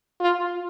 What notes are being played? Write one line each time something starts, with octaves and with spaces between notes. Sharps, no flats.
F4